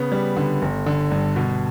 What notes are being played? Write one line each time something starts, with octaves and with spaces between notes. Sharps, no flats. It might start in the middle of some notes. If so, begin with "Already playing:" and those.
Already playing: C#3 B3
G3
D3
G1
D3
G2
B2